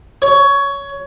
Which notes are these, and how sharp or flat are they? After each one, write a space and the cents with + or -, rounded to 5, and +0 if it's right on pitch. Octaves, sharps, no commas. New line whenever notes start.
C#5 +15